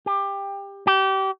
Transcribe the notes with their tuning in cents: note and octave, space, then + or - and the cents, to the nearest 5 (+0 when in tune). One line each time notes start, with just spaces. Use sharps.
G4 +20
G4 -30